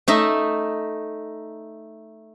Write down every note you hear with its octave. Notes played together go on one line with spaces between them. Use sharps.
A3 D#4 E5